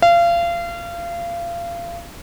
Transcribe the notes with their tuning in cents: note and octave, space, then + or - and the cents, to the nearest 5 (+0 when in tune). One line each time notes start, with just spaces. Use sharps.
F5 -30